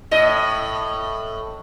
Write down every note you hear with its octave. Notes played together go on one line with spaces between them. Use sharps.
A2 D#5